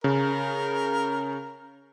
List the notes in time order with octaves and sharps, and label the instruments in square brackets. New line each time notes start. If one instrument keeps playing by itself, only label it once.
[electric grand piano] C#3 [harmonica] A#4